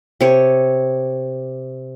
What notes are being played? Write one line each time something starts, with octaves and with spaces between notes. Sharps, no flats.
C3 C#5